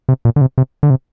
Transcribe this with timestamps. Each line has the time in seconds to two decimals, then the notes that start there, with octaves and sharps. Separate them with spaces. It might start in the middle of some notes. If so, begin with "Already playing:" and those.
0.09 C3
0.25 A#2
0.36 D3
0.41 C3
0.58 C3
0.83 D3
0.90 C3